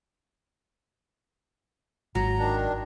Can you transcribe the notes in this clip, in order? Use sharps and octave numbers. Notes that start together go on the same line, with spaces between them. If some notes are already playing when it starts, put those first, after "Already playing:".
G#1 F#3 A#5
D#3 D4